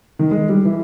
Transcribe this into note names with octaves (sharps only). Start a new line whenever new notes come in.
D#3
G#3
G3
E3